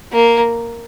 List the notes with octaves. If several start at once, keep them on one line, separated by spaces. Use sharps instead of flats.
A#3